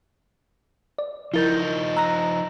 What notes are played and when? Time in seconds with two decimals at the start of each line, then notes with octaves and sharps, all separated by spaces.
0.98 D5
1.34 F3 D#4 E4 A#4 G6 A6 G7
1.97 A#5 E6 F#6 A#6